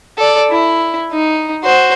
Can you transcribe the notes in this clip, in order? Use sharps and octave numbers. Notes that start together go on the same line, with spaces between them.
A4 D5
E4
D#4
F#4 C5